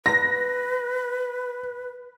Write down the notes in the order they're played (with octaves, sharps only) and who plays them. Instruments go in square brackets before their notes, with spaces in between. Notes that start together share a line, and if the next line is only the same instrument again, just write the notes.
[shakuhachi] B4 [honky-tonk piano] A#6